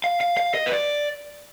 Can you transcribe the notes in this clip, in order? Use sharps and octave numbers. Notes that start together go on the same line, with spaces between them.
F5
F5
F5
D#5
B4
D5